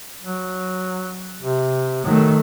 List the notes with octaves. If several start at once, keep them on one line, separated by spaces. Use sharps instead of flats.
F#3
C3
D#3 F#3 A3